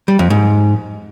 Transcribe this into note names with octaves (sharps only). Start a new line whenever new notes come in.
G3
F2
G#2